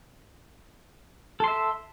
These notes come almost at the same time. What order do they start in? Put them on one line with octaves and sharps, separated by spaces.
A4 C6 E5